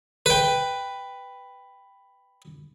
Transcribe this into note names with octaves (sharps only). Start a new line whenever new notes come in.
B4 G5